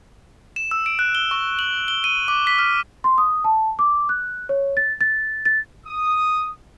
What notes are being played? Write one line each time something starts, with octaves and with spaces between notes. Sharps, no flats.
E7
E6
D7
F#6
G7
C#6
F#7
G7
D#7
D6
B6
F6
C6
D#6
A5
D6
F#6
C#5
A6
A6
A6
D#6